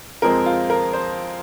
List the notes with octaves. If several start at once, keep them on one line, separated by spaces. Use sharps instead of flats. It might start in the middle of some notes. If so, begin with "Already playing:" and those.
F2 F3 G#3 C4 A#4
F4
A#4
C5